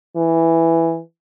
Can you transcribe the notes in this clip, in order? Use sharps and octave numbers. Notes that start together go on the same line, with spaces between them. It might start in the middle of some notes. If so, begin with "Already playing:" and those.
E3